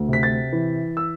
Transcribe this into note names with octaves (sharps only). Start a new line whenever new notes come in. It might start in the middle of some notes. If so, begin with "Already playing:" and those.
Already playing: D2
C3 B6
A6
E3
E6